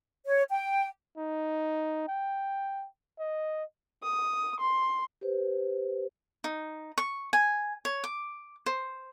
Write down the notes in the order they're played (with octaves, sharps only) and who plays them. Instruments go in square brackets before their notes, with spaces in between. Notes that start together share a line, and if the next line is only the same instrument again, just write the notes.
[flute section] C#5
G5
[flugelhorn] D#4
G5
D#5
[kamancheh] D#6
C6
[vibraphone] G4 B4 C5
[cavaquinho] D#4
C#6
G#5
C#5
D6
C5